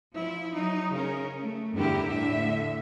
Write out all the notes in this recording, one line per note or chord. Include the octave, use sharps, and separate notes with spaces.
F3 E4
F#3 D#4
C#3 C#4 A#4
A3
E2 G2 D3 E4 G4 A#4
A2 D3 E5